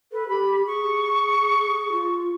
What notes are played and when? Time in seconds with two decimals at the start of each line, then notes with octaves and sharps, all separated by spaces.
0.12 A4 B4
0.28 G4 B5
0.66 G#4 C#6
1.92 F4